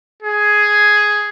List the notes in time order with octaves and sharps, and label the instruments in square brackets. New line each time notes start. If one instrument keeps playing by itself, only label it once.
[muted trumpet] G#4